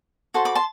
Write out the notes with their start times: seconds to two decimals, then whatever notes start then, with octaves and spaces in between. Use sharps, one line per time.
0.34 F#4 A4 C5 A5 C6
0.45 B5 D6
0.55 A5 C6